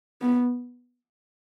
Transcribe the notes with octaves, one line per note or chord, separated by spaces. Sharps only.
B3